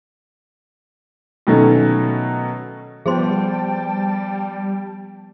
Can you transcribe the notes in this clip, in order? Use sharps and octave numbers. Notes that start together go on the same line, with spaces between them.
B2 D#3 F#3 A3 C#4
F3 G3 B3 G#4 C5 G5 A5 C6